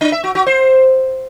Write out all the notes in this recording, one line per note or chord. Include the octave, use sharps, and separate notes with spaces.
D4
E5
F#4
F#4
C5